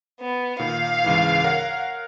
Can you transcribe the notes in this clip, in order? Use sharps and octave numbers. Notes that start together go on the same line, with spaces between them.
B3
A#2 D#3 F5
C#2 G#2 E3
A#4 C#5 F#5